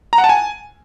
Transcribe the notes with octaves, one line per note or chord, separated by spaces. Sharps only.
A#5
F#5
A5
G#5